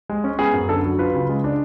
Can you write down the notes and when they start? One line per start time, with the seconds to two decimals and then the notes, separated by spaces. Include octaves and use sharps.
0.09 G#3
0.24 C#4
0.39 B3 G#4
0.54 F#2
0.69 D3 A4
0.85 F#3
0.98 F4 B4
1.14 C#3
1.29 G#3
1.44 D4